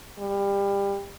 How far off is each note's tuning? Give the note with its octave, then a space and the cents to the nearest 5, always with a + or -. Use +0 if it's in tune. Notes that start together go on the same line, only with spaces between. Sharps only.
G3 +25